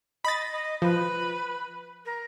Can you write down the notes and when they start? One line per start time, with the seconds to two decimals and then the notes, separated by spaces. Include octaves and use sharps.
0.25 D#5 B5 A6
0.52 D#5
0.82 F3 B4
2.05 A#4